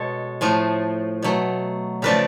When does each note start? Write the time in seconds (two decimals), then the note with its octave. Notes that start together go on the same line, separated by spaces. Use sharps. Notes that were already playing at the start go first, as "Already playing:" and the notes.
Already playing: B2 G#3 A4 C#5
0.41 A2 F3 A3
1.22 B2 F#3 A3
2.02 C#3 F3 A3 B4 D5